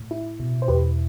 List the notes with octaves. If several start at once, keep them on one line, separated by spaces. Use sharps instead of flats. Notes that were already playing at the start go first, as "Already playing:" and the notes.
Already playing: A2
E4
B2
C5
E2 G4 B4